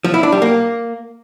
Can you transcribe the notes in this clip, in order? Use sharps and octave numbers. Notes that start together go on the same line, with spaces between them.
F3
E4
D4
G3
A#3